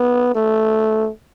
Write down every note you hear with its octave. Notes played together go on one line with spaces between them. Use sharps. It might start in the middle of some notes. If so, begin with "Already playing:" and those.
Already playing: B3
A3